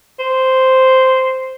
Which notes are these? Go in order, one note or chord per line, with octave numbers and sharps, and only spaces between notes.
C5